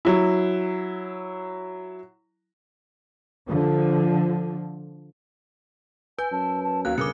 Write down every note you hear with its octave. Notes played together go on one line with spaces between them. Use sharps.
F#3 E4
D3 F3
B4 G#5 G6
F#2 A5
A5
D#2 F#3 F5 F#6
G1 C#3 A#4 D6 F#6 C#7